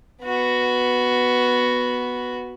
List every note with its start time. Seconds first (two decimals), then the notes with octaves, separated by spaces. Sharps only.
0.22 B3 F#4